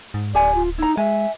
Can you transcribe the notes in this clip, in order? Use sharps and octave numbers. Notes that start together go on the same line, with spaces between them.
G#2
D1 G4 D5 G#5
F4
D#4 E4 A#5
G#3 E5 G#5